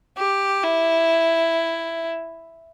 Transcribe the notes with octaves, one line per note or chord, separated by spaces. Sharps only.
G4
E4